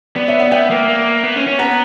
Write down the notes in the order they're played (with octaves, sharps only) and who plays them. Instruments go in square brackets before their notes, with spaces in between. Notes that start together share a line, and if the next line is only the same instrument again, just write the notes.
[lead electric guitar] B3 [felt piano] D5
[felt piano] C#5 E5
D5 F#5
[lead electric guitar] B3 [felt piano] E5 G5
[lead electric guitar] A#3
A#3
B3
C#4
C#4
[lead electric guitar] B3 [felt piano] F#5 A#5